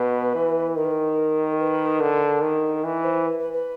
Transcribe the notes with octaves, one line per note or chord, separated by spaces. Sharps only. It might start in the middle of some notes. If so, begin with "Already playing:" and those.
Already playing: B2 B4
E3
D#3 A#4
B4
A#4
B4
D3 A#4
D#3
E3 B4
C5
B4
B4
B4